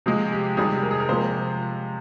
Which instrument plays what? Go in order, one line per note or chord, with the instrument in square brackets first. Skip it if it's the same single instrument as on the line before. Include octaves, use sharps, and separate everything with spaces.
[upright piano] C3 F3 G#3 G#4
G4
C3 D#3 G3 G#4
A#4
G#4
A#4
C3 F3 G#3 C5